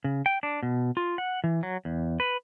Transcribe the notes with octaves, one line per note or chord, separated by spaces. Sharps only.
C#3
G5
D4
B2
F4
F#5
E3
F#3
E2
B4